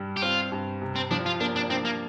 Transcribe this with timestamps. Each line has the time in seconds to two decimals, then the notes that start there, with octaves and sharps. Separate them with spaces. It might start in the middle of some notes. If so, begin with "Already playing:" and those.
Already playing: G2 G3
0.17 G4
0.22 C4 F4
0.52 G2
0.82 C3
0.96 C4
1.11 F3 D4
1.26 F4
1.40 A#3 D4
1.56 D4
1.70 C4 D4
1.85 A#3